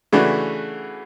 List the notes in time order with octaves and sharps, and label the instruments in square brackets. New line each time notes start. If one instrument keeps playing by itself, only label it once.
[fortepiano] C#3 E3 A3 D4 F#4